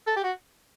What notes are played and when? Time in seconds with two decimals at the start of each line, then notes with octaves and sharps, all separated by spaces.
0.07 A4
0.16 G4
0.24 F#4